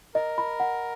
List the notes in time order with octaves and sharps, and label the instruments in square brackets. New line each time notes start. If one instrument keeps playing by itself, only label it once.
[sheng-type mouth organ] A#4 [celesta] D#5
[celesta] B5
F#5